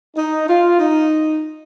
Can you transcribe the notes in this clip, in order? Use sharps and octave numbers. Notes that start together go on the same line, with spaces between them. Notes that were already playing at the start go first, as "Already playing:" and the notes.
D#4
F4
D#4